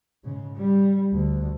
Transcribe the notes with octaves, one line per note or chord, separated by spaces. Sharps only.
G#2 C#3
G3
D2